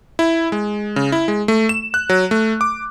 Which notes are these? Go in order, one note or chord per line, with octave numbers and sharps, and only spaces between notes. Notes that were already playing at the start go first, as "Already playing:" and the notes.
E4
G#3
C#3
E4
G#3
A3
E7
F#6
F#3
A3
D6